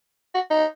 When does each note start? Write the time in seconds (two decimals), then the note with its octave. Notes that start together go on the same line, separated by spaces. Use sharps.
0.35 F#4
0.51 D#4